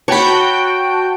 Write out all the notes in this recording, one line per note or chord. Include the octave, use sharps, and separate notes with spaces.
F#4 C#5 G5 A5 B5